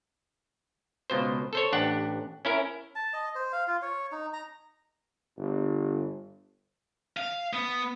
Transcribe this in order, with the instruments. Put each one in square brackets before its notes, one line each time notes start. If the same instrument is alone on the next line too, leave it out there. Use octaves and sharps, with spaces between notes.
[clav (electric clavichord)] C#2 B2 C5
A4 C5 C#5
A1 D4 G4 F#5
C#4 E4 A#4
[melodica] A5
D#5
C5
F5
F4
C#5
D#4
A#5
[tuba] G1
[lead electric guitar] F5
B3